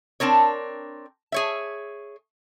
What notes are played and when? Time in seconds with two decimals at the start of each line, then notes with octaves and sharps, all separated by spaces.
0.20 C4 D4 A#4 C#5
1.32 G#4 C#5 E5